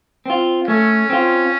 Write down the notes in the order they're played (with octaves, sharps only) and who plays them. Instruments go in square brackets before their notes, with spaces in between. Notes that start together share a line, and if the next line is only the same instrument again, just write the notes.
[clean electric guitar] C4 F4
[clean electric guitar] A3 [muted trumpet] C#4
[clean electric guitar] C4 F4